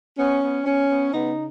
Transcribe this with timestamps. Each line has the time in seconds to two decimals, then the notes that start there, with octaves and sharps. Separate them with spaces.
0.18 B3 C#4
0.42 B3
0.65 B3 C#4
0.89 B3
1.12 C#3 B3 D#4